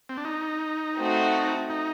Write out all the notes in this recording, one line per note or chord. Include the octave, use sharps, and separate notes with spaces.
C4
D4
D#4
A3 C4 F#4
D#4